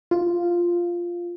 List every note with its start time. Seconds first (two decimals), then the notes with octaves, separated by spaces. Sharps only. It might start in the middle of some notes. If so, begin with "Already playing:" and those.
0.11 F4